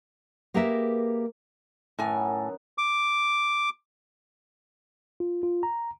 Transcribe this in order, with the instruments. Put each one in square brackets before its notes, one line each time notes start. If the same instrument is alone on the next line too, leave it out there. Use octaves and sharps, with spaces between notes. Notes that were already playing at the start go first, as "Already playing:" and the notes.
[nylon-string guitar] A#3 G4 G#4 A#4 B4 E5
[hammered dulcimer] F#2 D#3 B3 [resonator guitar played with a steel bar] A2 G#5
[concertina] D6
[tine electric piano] F4
F4
A#5